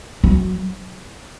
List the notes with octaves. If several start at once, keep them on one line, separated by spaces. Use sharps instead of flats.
F#3